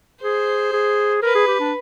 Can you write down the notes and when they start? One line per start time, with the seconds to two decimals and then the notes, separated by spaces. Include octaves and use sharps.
0.22 G#4 C5
0.72 G#4
1.22 A#4 B4
1.35 G#4
1.47 G4
1.60 D4